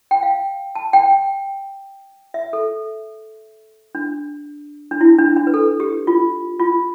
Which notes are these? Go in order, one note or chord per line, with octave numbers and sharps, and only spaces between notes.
G5
F5
A5
G5
E5
A4
D4
D4
E4
D4
D4
B4
A4
G4
F4
F4